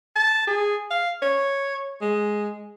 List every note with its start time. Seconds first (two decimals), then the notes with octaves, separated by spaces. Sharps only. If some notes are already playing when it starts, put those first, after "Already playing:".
0.16 A5
0.47 G#4
0.91 F5
1.22 C#5
2.01 G#3